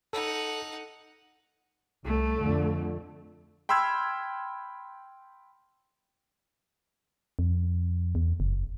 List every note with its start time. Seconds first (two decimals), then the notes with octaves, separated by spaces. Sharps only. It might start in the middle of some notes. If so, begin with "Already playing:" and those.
0.13 D#4 A4 F#5
2.05 C2 A3
2.37 F2 D3
3.69 G5 B5 C6 E6 F6 G#6
7.39 F2
8.15 E2
8.40 F#1